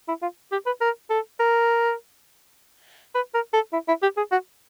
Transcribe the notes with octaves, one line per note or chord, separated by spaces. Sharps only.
E4
F4
G4
B4
A#4
A4
A#4
B4
A#4
A4
E4
E4
G4
G#4
F#4